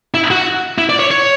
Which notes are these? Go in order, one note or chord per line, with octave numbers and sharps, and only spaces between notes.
E4
F#4
E4
D5
C#5
C#5